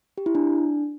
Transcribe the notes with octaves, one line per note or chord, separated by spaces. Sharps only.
G4
E4
D4